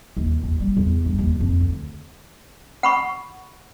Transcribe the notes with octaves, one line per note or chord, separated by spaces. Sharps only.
D#2
D#2
G3
E2
G2
D#2
F2
D2
F#5 B5 C#6